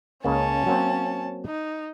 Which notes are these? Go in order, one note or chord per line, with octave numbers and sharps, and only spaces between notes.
C#2 C#3 A#3 C#4 A5
F#3 A#3 C4
D#4